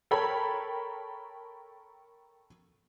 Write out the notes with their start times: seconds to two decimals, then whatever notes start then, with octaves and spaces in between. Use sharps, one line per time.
0.11 A4 A#4 C#5 G5 B5